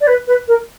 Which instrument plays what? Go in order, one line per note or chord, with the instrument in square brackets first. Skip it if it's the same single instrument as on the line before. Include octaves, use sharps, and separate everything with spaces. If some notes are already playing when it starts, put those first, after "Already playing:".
[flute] D5
B4
B4
A#4